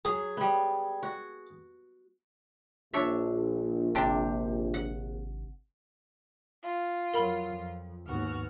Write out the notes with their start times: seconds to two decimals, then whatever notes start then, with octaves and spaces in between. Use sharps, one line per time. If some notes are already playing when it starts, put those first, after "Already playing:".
0.05 F#3 G#4
0.37 G3 B3
1.03 F#4
2.93 A#1 D4 C#5 E5
3.95 G#1 C3 D4 G4
4.74 F#5
6.63 F4
7.14 F2 F#3 A#4 B5 G7
7.48 F2
8.07 D#2 G#2 B3 F#4 F6